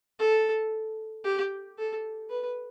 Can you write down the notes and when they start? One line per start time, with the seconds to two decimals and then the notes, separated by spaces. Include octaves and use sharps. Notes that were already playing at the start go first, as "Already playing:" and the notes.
0.19 A4
1.24 G4
1.78 A4
2.30 B4